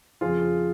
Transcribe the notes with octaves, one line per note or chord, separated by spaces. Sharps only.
F2 C#3 F3 F4 G#4